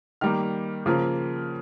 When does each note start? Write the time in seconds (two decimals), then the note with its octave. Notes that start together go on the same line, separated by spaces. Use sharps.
0.21 D#3 G3 A#3 F6
0.86 C#3 F3 A#3